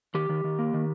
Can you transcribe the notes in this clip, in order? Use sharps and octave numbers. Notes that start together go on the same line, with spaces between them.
D#3 G4
D#3
D#3
A#3
D#3